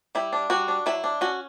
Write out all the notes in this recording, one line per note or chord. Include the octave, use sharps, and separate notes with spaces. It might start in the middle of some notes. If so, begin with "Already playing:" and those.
G3 E4
D4
G3 F#4
D4
F#3 E4
D4
C#4 F#4